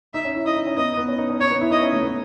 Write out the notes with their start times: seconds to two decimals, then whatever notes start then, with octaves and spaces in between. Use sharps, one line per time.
0.14 D#4 E5
0.24 C#4
0.35 E4
0.45 E4 D#5
0.56 D#4
0.67 C#4
0.77 B3 D#5
0.97 B3
1.08 C#4
1.18 D#4
1.29 C#4
1.40 C#4 C#5
1.51 B3
1.61 E4
1.71 D#4 D#5
1.82 C#4
1.93 A3
2.03 B3